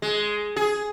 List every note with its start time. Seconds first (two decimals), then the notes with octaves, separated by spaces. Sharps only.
0.02 G#3
0.56 G#4